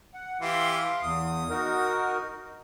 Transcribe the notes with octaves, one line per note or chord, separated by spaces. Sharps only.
F#5
E3 G4 F5 C6
E2 D#6
D#4 F#4 A#4